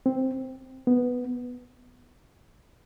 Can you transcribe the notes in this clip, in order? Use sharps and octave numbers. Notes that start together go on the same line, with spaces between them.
C4
B3